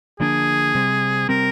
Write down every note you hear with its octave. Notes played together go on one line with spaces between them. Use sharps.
D3 F3 A#3 D4 G#4
C3 G3 C4
C3 G3 C4 A#4